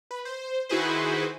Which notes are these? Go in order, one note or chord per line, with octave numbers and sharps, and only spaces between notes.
B4
C5
D#3 E4 F#4 G#4 B4 C5